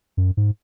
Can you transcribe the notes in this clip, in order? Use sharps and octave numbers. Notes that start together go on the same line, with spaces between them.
F#2
G#2